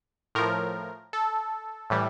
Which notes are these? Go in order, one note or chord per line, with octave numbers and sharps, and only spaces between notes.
A2 F3 A#4
A4
A2 E3 G3